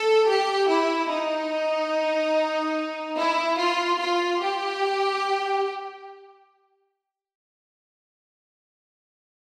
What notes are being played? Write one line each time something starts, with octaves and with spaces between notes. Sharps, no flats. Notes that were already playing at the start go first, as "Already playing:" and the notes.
Already playing: A4
G4
E4
D#4
E4
F4
F4
G4